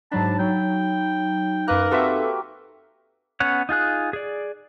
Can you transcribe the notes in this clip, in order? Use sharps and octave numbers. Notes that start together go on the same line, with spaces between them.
G#2 F#3 D4 A5 B5
F#3 D#4 G5
F#2 A#3 A#4 B4 F#6
C4 F#4 G4 A4 B4 E5
B3 C#4 C#5 F#5
D#4 F4 G#4 F#6
G#4 D5